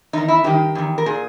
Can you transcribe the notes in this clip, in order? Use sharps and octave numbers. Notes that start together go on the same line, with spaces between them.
E2 D#3 D#4
E4
G2 D#3 G4
E2 D#3
A#4
A#2 G#4